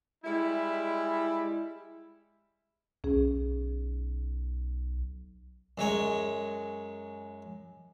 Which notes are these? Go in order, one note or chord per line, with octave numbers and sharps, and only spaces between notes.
G3 G#3 E4
B1 C#4 G#4
F#2 G#3 C#5